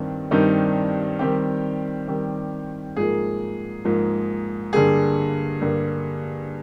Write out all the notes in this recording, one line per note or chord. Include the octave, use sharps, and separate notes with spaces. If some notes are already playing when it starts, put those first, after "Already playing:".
Already playing: G2 D#3 G3 C4
G2 D#3 G3 C4 D#4
D#3 G3 C4 G4
D#3 G3 C4
G#2 F3 A#3 G#4
G#2 F3 A#3
G2 D3 G3 A#3 G#4
G2 D3 G3 A#3